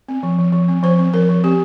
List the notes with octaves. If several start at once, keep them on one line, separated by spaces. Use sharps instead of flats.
C4
F3
F3
F3
C4
F3 C5
C4
F3 A#4
F3
C4 G4